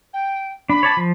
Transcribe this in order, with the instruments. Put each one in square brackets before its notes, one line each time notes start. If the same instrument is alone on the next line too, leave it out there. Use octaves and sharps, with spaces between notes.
[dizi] G5
[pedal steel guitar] D4 [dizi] B5
[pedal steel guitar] C#5 D5 A5
F3